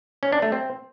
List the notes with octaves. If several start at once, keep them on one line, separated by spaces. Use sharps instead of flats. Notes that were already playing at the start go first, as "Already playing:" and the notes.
C#4
D4
A3
C4